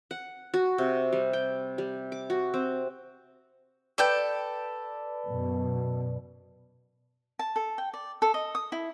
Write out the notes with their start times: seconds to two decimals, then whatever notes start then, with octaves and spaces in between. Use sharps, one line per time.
0.11 F#5
0.54 F#4
0.78 C3
1.13 G3
1.33 G5
1.78 G3
2.12 D6
2.30 F#4
2.54 C4
3.98 A4 B4 D5 G5 G6
5.26 F#2 B2
7.39 A5
7.56 A4
7.78 G5
7.94 D5
8.22 A4
8.34 D#5
8.55 D#6
8.72 E4